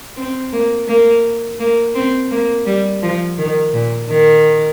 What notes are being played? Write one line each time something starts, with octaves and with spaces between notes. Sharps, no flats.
C4
A#3
A#3
A#3
C4
A#3
G3
F3
D#3
A#2
D#3